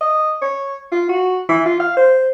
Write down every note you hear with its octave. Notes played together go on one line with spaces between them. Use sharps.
D#5
C#5
F4
F#4
E3
F4
F5
C5